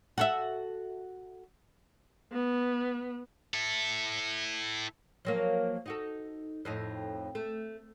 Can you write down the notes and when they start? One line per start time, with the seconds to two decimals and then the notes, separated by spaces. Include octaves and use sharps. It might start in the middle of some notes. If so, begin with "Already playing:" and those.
0.18 F#4 A4 E5
2.32 B3
3.54 E4 A4
5.25 F3 F#3 A#3
5.86 D#4 F#4 A4
6.65 F2 A2 D#4
7.35 A3